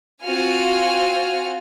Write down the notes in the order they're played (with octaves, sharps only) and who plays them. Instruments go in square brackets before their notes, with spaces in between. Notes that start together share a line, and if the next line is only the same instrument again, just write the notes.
[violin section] C4 F4 F#4 F#5 G#5 F6